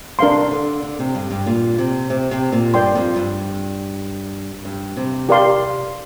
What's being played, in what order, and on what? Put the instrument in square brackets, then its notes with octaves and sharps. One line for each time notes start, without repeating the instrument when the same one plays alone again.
[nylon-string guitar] C3 [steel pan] D4 A#4 F5 C6
[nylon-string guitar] D3
D3
C3
G2
G2
A#2
C3
C3
C3
A#2
[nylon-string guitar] G2 [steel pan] A#4 D5 G5 C6
[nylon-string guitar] F2
G2
G2
C3
[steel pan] G4 A#4 D5 F5 C6